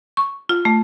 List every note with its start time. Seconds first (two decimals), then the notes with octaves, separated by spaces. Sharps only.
0.17 C#6
0.49 F4
0.65 A3